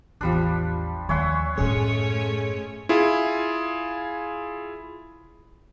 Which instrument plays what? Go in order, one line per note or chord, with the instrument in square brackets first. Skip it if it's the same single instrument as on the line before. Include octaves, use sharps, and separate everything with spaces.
[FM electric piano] A1 E2 [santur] F3 G3 D4
[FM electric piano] D#2 G#5 C6 [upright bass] F3 [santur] C#5 E5 F#5
[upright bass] F#2 A2 [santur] G#3 [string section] A3 C#4 C#5 [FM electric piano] G#4
[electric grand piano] E4 F4 G#4